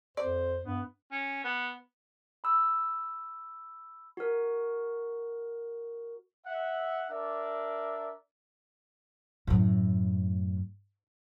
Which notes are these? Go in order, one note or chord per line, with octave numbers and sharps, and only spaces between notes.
F2 C5 D5
G2 B3
C#4
B3
B5 E6
F#4 A#4
E5 F#5
D4 A#4 D5 E5
F#2 A2